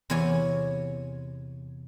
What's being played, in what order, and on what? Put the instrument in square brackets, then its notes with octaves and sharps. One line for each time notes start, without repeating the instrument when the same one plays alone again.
[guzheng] E2 C3 E4 C#5 G#5